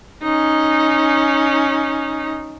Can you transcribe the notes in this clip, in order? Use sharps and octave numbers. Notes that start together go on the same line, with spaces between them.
C#4 D#4